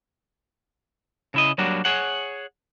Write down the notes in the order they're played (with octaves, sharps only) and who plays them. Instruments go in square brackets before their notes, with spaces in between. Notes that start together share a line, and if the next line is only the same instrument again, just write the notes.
[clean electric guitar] C#3 E4 D#5
F#3 G3 A#3 D4 F#4
G#4 C#5 F#5